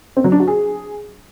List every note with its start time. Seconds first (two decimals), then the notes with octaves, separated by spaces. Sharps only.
0.17 C4
0.24 F#3
0.32 D4
0.40 F#4
0.48 G#4